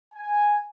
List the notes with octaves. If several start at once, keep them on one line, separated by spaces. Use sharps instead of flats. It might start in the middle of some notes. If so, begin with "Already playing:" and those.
G#5